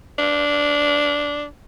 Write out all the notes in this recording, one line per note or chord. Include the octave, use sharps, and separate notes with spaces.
D4